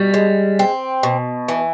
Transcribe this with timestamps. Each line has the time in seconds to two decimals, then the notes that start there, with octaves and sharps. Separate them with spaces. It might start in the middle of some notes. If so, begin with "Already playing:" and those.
Already playing: B2 G3
0.14 G#3
0.59 C4
1.03 B2
1.48 E3